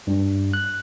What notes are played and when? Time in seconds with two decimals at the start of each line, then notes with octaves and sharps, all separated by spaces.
0.07 G2
0.53 F#6